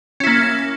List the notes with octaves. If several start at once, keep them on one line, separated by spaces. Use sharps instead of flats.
A#3 C#4 E4